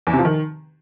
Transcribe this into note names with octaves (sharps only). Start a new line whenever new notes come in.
E2
C3
F3
D#3